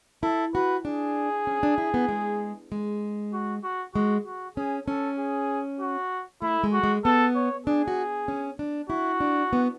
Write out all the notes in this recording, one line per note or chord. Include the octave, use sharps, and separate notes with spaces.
E4 A4
F#4 B4
D4 G#4
C#4
D4
E4
B3
G#3
G#3
F#4
F#4
G#3 F#4
F#4
C#4 G#4
C#4 A4
G#4
F#4
A3 E4
G#3
F#4
G#3
B3 A4
C#5
D4 G#4
F#4
C#4
D4
E4 F#4
D4
B3